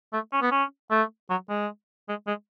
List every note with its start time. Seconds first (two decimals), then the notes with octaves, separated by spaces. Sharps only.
0.13 A3
0.32 C#4
0.42 B3
0.51 C#4
0.91 A3
1.30 F#3
1.49 G#3
2.09 G#3
2.27 G#3